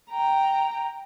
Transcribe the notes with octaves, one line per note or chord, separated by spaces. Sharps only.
G5 A#5